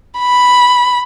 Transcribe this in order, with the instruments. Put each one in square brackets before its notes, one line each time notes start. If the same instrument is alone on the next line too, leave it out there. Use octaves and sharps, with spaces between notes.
[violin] B5